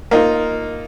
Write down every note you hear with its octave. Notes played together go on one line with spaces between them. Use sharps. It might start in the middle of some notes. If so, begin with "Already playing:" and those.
A#3 D#4 F4